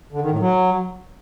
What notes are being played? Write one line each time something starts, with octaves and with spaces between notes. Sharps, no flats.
D3
D#3
A2
F#3